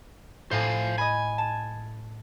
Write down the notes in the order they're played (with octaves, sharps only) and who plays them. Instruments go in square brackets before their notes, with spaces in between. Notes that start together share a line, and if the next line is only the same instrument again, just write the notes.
[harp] A2 [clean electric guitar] C5 F5 G#5
[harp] D#5 B5 [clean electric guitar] G#5
[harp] A5